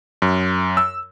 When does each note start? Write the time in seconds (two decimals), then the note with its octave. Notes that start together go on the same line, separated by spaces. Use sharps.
0.22 F#2
0.77 E6